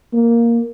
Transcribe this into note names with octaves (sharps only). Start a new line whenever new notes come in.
A#3